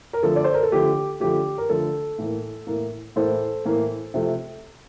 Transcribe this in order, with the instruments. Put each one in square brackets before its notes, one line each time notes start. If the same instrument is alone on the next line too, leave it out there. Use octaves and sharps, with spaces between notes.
[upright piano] A#4
D3 F3 A3 A4
D5
C5
A#4
A4
D3 F3 A3 G4
D3 F3 A3 G4
A#4
D3 F3 A3 A4
A2 E3 A#3
A2 E3 A#3
A2 E3 A#3 A4 C5
A2 E3 A#3
C3 F3 A3